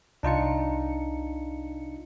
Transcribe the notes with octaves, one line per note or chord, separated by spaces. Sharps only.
C2 D4 D#4 F4 C#7